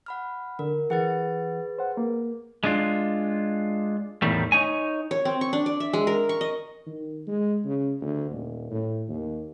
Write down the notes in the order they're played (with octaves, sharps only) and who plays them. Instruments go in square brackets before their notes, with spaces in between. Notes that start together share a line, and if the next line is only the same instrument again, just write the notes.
[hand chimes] F#5 B5 F6
[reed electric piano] D3 [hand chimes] A#4
[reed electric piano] E3 F#5 [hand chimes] G#4 B4 A6
[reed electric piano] C5 F#5
A#3
[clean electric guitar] G#3 D4 F4
E2 A2 D#3 G3 A3
D#4 C#5 G#5
[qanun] C#5
C4
C#6
D4
D5
E5
G#3
A#4
C#6
D#5
[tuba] D#3
G#3
C#3
D2
D#1
A2
D#2